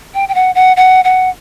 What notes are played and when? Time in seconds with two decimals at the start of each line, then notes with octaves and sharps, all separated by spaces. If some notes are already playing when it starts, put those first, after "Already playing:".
0.14 G5
0.29 G5
0.35 F#5
0.55 F#5
0.77 F#5
1.05 F#5